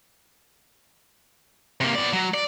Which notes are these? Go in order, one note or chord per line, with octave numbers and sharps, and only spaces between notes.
C3 A#3
B3 D5
F#3
D5